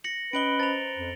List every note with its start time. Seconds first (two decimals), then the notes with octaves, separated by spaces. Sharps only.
0.04 A#6 C#7 F#7
0.33 C#4 B4 D#5 D7 F#7 G7
0.60 C5 A#5 A6 F7
0.98 F2